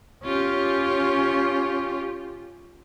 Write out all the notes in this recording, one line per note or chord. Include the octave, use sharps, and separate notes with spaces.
C#4 F4 G4